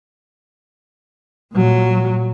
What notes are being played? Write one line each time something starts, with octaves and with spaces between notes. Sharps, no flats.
A#2 F#3